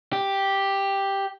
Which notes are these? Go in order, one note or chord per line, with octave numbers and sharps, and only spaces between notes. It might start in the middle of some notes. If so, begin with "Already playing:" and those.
G4